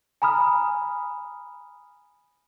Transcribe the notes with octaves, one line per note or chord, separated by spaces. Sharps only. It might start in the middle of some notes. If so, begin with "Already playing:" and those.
G#5 A#5 B5 D#6 F6